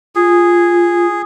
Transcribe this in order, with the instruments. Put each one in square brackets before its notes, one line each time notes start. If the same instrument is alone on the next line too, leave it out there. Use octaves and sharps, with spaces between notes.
[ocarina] F4 [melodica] G#4